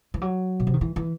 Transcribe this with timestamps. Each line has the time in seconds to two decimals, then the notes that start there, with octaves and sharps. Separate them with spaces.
0.14 E3
0.21 F#3
0.60 B2
0.67 C3
0.74 D#3
0.81 E3
0.96 E3